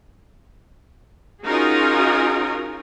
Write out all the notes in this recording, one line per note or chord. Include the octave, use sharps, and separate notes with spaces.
C#4 D#4 F4 F#4 G#4 A#4